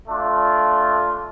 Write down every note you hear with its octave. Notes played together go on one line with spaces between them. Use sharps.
A3 D4 F4